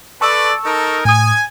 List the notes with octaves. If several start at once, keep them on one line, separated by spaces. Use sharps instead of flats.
A4 B4 D5 A5 C#6 E6
D#4 A4 A#4
A2 G#5 D#6